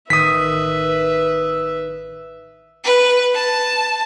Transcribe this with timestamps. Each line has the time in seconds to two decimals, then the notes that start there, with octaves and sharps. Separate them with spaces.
0.10 A1 D#3 B4 E5 D#6 B6
2.84 B4
3.34 A5